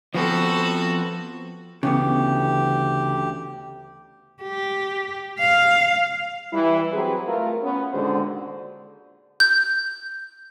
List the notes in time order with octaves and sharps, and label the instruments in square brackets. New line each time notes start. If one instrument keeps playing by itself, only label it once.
[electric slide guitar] F3 B3 C4 [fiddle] F#4 A4
[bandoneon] D2 G4 [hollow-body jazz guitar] C#3 E3 B3
[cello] G4
F5
[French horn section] E3 G3 E4
F#3 C4 G4 G#4 B4
A3 F4 A#4
B3 C#4
A#2 D3 D#3 G#3 F#4 C5
[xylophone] G6